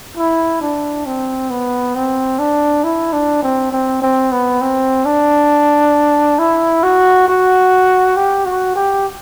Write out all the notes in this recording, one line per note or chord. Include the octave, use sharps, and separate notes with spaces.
E4
D4
C4
B3
C4
D4
E4
D4
C4
C4
C4
B3
C4
D4
E4
F#4
F#4
G4
F#4
G4